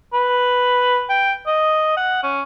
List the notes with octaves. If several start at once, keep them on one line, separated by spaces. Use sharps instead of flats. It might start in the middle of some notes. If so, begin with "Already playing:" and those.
B4
G5
D#5
F#5
C#4